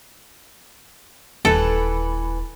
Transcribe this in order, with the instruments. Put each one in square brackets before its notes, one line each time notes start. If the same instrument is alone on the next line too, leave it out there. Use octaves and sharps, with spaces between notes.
[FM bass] D#1 [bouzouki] E3 B4 [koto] A4